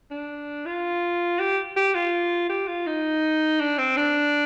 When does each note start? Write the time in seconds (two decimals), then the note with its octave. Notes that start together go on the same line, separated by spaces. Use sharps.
0.11 D4
0.66 F4
1.39 G4
1.76 G4
1.95 F4
2.50 G4
2.68 F4
2.87 D#4
3.60 D4
3.78 C4
3.97 D4